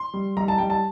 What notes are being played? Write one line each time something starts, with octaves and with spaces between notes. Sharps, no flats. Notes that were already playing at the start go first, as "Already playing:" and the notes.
Already playing: C6
G3
G3 A#5
A5
G3 G5
A5